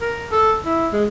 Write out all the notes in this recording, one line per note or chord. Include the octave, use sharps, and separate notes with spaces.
A#4
A4
E4
G#3